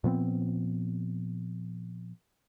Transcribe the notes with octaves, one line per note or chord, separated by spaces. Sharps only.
A#2 F3 B3 C4